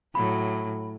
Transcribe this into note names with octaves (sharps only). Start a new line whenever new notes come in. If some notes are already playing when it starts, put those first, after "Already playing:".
A2 F#3 B5